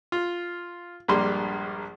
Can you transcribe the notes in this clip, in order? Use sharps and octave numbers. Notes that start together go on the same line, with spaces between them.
F4
A#1 G2 G3 G#3 A#3 C6